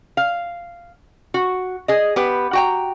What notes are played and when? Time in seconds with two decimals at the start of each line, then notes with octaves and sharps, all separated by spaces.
0.17 F5
1.34 F#4
1.88 G#4 D#5
2.16 B3 G4 B4
2.53 F#4 G5 A#5